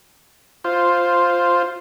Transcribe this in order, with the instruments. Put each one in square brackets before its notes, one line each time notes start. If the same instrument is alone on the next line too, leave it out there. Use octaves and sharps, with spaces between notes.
[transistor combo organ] F4 C5